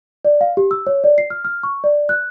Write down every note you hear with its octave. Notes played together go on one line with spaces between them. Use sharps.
D5
F5
G4
E6
C#5
D5
C7
F6
F6
C#6
D5
F#6